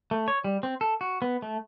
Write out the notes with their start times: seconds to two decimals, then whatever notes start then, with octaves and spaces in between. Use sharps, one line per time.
0.11 A3
0.28 C#5
0.44 G3
0.63 C4
0.81 A4
1.01 F#4
1.22 B3
1.42 A3